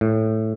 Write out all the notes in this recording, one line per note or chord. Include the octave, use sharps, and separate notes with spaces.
A2